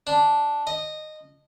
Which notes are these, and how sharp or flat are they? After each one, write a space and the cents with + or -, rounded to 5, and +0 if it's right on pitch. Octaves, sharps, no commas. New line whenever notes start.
D4 -5
D#5 -15